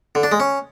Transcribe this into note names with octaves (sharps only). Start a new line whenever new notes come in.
D3
D4
G#3
C#4